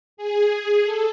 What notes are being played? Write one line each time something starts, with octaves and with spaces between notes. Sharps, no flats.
G#4
A4